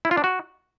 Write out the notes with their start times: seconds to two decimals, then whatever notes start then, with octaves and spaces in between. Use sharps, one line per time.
0.05 E4
0.11 F4
0.17 D4
0.24 F#4